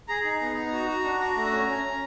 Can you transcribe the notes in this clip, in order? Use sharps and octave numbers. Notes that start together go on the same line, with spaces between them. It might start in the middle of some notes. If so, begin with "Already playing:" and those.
G#4 A#5
D#4
B3
D#4
F#4
F#4
D4
F#4
A3
C#4
C#4
C#4